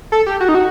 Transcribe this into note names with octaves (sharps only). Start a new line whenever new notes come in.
A4
G4
F#4
D#4
F#4